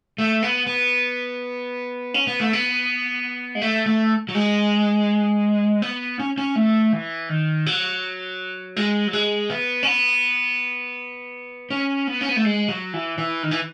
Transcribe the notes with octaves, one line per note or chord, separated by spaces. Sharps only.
A3
B3
B3
C#4
B3
A3
B3
G#3
A3
A3
F#3
G#3
B3
C#4
C#4
A3
E3
D#3
F#3
G#3
F#3
G#3
B3
C#4
B3
C#4
B3
C#4
B3
A3
G#3
F#3
E3
E3
D#3
E3